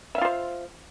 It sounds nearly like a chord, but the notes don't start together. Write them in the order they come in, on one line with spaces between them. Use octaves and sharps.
E5 F5 F4 C5